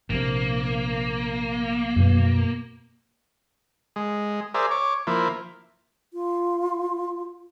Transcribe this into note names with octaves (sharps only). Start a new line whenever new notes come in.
A#1 C3 A#3
F#2 B2
G#3
G#4 A#4 C5 D5 E5
C#5 D6
F3 A#3 E4
F4